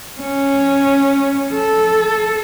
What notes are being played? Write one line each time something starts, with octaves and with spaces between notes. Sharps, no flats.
C#4
A4